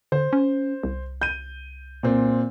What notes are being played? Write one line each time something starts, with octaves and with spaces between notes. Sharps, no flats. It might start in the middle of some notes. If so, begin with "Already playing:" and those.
D3 C5
C#4
C2
G6 D#7
A#2 C4